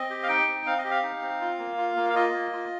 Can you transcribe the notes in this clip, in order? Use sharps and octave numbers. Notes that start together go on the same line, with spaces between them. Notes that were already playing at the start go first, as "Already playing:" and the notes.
Already playing: C4 D#5
G4
F5
D#4 G5
C4
C4 F5
D#5
G4
F5
D#4
C4
F4
A#3
F4
A#3
F5
F4 D#5
A#3
F4